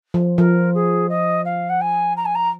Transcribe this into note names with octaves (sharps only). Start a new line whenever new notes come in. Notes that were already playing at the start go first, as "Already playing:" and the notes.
F3
F3 A#4
G#4
D#5
F5
F#5
G#5
A#5
G#5
A#5